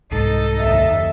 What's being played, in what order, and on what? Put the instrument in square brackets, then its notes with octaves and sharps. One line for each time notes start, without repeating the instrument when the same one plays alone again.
[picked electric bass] C2 G#2 [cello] D#4 A4
[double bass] F#1 D#2 [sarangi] E5